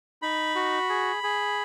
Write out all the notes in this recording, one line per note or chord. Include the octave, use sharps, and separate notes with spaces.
D#4 B5
F#4
G#4
G#4